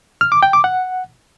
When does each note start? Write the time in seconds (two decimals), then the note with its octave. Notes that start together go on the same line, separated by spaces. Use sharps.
0.21 F6
0.32 D6
0.43 G5
0.53 D6
0.64 F#5